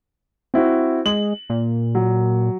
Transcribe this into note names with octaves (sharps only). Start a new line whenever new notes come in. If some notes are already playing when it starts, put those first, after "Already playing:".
C4 E4 F#4
G#3 F#7
A#2
F#3